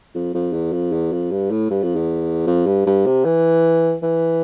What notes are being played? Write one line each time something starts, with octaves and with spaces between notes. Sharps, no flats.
F2
F2
E2
F2
E2
F2
G2
A2
G2
F2
E2
F2
G2
G2
C3
E3
E3